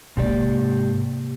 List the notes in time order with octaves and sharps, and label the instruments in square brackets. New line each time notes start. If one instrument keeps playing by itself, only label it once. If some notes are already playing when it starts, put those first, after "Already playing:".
[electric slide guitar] G#2 G4 D5 [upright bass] C3 A#3